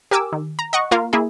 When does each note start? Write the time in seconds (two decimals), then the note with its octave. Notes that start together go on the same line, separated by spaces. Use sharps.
0.11 G4 A#4 G#5 D6 E6
0.33 D#3
0.59 A#5
0.73 D#5 F#5 C#6
0.91 A#3 F4 A#4 F5
1.13 A#3 E4 G#4